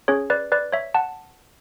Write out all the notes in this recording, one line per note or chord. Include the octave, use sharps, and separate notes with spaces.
C#4 G#4 C#5
B4 D5
B4 D5
C#5 E5
F#5 A5